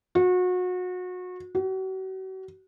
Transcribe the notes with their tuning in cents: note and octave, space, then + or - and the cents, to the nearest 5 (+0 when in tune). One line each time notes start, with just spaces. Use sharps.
F#4 -30
F#4 +40